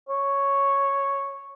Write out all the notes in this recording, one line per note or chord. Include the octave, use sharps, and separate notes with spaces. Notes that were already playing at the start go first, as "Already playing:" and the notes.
C#5